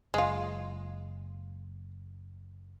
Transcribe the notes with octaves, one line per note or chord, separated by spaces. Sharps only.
F#1 G#3 F4